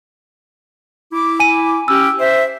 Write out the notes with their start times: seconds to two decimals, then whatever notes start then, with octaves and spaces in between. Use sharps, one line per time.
1.12 E4 D6
1.40 G#5 D#7
1.88 C#4 G4 E6
2.19 C5 E5